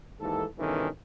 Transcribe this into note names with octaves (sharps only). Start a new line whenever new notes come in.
D#2 G#2 E3 A4
G2 B2 D#3 E3 C#4 A4